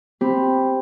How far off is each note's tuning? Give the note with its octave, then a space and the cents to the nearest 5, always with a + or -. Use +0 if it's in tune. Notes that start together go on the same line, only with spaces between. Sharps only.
C4 +0 G4 +5 B5 +0